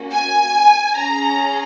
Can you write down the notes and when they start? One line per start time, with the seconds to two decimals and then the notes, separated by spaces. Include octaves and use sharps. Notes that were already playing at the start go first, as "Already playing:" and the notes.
Already playing: A#3 C#4 F#4
0.12 G#5
0.97 C#4 G#4 A#5